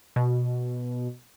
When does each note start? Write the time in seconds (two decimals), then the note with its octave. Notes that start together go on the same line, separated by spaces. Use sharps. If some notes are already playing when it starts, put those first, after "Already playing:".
0.16 B2